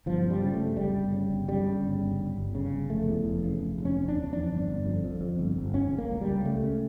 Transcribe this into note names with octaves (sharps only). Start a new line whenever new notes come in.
G1 F3
C#3
G3
C#3
A3
G1
G1 G3
G1
C#3
G1
C#3 G3
C#3
G1
G1
G1
G1
C#3
G1
F1 A3
E2
F1
C#3
F1
F1
C#4
F1
D4
E2
F2 D4
G1
G1
F2
F2
F2
G1
G1
C#2 C#4
C#3
A#3
C#2
G3
C#2
C#3 A3
C#3